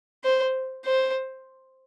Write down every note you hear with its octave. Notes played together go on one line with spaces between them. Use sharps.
C5
C5